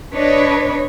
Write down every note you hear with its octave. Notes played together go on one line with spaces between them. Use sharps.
D4 B4 C#5 D#5